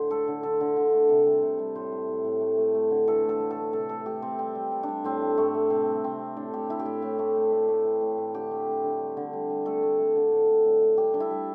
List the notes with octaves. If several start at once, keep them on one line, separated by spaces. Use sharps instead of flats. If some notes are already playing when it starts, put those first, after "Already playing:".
Already playing: A2 D3 C5
A3 A4
D3
D3 A4
D3
D3
A3
C3
G3
C3
G3
A2 C5
A2
A2
A2
A3
A3
A3
D3
E3 A4
A2
A4
A3
A4
A3
C3 A4
A3 A4
A3 G4
A3 C4
G3 C4
G3
G3
D4
G3
A2 C4
A2
A2 A3
A3
C3 C4
G3
C3 C4
G3
A2 D4
A3 G4
A3 E4
G4
A2 E4
A2
A3
A3
A3
A3
E3
A2
A2
D3 G4
A3
A3
D3
G3
D3
G3
G3
A3 A4
A3
A3
D3
A2
A2
A2
A3
G3 G4
G3 D4
E4
G3